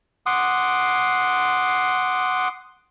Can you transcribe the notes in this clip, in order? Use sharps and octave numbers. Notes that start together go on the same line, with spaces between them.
F#5 C6 D6 D#6